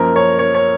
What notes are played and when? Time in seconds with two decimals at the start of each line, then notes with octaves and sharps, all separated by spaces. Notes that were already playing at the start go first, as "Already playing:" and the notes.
Already playing: F#2 F3 A#3 A#4
0.16 C#5
0.39 C#5
0.55 C#5